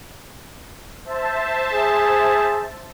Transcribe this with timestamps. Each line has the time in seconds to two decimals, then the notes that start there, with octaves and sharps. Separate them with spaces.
1.05 C5 E5 A5
1.73 G#4